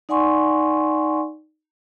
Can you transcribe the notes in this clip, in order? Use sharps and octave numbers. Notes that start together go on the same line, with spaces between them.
D#4 D5 F#5 G#5 C6 C#6